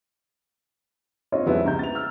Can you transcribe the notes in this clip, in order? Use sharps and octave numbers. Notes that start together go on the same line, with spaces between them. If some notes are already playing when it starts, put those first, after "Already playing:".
C4 F4 C#5 D#5
F2 G3 G#3 B3 E4
C#2 A#5 G6
A6 F7
E6 F6